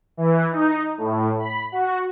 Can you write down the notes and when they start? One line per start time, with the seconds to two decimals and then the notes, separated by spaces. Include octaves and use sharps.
0.17 E3
0.51 D#4
0.98 A2
1.39 B5
1.72 F#4